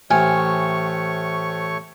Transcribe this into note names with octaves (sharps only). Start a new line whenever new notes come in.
A1 A3 C5 C#5 G5 G#5 C#6 F6